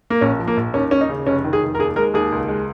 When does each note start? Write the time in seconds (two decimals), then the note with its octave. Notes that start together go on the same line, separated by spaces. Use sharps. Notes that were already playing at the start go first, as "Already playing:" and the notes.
0.10 A#3
0.21 A#1 C#4
0.39 F3
0.48 A#3
0.57 A#1
0.74 D#2 C#4
0.91 D#2 C#4
1.01 D#4
1.09 C#3
1.26 F1 C#4
1.44 D#3
1.53 G#4
1.62 F1
1.75 A#4
1.79 D#2 G#4
1.96 G#3 A#4
2.14 D#2 G#4
2.32 C#2
2.49 G#3